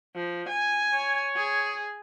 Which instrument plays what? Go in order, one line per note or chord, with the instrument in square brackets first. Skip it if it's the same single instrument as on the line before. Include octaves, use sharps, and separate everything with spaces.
[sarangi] F3
G#5
[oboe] C#5
[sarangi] G#4